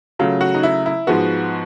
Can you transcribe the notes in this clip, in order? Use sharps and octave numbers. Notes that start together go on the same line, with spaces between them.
C#3 F#3 A3 F4
F#4
D#4
E4
E4
G#2 F3 G#3 B3 F#4